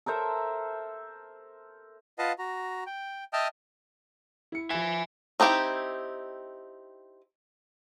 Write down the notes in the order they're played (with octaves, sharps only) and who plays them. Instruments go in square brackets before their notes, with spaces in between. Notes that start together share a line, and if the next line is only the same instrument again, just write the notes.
[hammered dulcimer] A4 A#4 C5 E5
[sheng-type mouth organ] F4 B4 D#5 F5 F#5 A5
F#4 A#5
G5
D#5 E5 G5 A5 D#6 F6
[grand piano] E4 C#7
[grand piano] F3 E7 [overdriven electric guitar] E5 G#5
[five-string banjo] C4 D#4 E4 G4